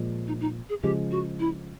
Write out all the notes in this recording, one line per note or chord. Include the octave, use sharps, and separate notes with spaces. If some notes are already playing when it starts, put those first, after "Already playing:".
Already playing: A#2 F3 G#3
D#4
D#4
G#4
C#3 F3 G#3 G4
F#4
E4